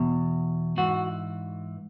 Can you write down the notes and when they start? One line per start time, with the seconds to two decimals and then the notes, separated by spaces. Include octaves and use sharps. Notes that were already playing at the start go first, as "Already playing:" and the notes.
Already playing: E2 B2
0.77 G#2 E3 F#4